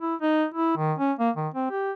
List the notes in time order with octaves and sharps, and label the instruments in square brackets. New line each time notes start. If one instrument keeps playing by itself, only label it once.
[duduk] E4
D#4
E4
D#3
C#4
A#3
D#3
C4
G4